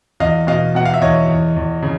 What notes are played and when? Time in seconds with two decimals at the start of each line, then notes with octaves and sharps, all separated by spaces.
0.20 E2 D#5 F5
0.47 B2 D#5 F5
0.75 B2 F#5
0.86 F5
0.94 E5
1.01 E2 C#5 D#5
1.29 E2
1.56 E2
1.83 C#3